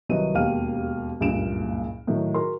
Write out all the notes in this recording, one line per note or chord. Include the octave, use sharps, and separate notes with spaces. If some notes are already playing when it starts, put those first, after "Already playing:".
C2 D#3 F#3 B4 D#5 D#7
E1 D#2 G4 F5 F6 D#7
F#1 C#2 G2 A#2 D7 E7
A2 D#3 F#3
F#4 G#4 A#4 C6